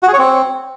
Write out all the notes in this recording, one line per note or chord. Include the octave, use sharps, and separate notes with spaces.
F#4
G#4
C#5
C4